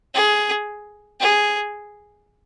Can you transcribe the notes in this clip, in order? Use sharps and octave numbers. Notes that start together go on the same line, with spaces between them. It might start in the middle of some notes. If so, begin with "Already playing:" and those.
G#4
G#4